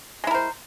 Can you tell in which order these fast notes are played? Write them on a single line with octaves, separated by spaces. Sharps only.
G#3 E4 A#4 C5